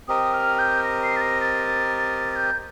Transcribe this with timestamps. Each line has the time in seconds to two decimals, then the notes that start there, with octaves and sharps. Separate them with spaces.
0.08 C4 G4 A#4 D#5 D#6
0.33 F6
0.59 G6
0.84 A#6
1.03 C7
1.16 A6
1.21 A#6
1.41 A6
2.36 G6